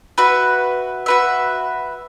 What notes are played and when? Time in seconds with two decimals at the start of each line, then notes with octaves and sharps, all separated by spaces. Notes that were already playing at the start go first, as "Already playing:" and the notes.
0.18 F#4 B4 E5
1.06 F#4 B4 E5